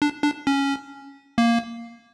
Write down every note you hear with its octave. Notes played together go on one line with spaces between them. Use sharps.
D4
D4
C#4
A#3